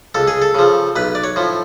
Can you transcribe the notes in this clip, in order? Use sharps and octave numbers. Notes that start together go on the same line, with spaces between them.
C#2 A4
G#4
A4
C#3 F3
B1 B4
D5
C#5
A2 F3